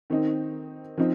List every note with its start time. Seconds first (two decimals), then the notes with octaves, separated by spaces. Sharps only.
0.10 D#3 C4 D#4
0.98 F3 C4 D#4